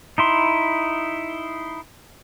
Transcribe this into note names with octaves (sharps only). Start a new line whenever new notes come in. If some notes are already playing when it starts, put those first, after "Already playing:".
D#4 E4 C6